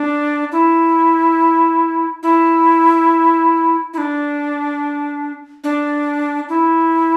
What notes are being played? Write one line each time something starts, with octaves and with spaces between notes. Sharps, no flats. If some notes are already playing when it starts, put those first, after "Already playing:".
Already playing: D4
E4
E4
E4
D4
D4
E4